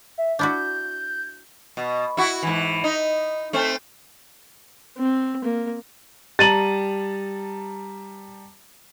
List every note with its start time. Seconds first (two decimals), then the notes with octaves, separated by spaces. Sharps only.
0.18 E5
0.39 D4 E4 F#4 G6
1.77 B2
2.17 E4 F#4
2.43 G#2 E3
2.84 D#4
3.53 A3 C4 C5
4.98 C4
5.44 A#3
6.39 G3 A5 A#5 A6 D#7 F#7